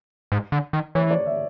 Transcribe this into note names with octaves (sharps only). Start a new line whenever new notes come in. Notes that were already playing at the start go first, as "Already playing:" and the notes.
G#2
D3
D#3
E3 C#5
D5
E5